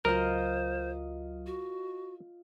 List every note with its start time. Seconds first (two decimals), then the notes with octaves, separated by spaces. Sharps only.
0.05 C#2 F#3 F4 A#4 C5 D#5
1.46 F#4